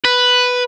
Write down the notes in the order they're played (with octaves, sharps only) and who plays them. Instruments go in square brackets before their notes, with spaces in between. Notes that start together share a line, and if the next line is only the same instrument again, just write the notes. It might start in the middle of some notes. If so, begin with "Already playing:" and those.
[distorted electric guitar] B4